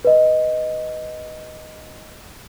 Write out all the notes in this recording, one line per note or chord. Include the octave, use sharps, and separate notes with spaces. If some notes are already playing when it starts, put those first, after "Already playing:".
B4 D#5